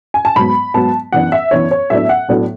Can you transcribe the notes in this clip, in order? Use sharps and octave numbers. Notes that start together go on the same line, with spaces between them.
G#5
A5
G#2 F#3 B3 B5
G#2 F#3 B3 A5
F#2 E3 B3 D4 F#5
E5
F#2 E3 B3 D4 C#5
C#5
A2 F#3 B3 D4 E5
F#5
A2 F#3 B3 D4